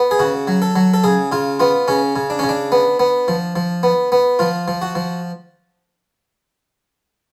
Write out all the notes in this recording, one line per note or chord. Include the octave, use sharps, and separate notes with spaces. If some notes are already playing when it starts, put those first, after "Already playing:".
Already playing: B3
G#4
C#3 F#4
F#3
A4
F#3
A4
C#3 G#4
C#3 F4
B3 F4
C#3 C#4
C#3
D4
C#3 C#4
D4
B3
B3
F3
F3
B3
B3
F3 F4
F3
F#4
F3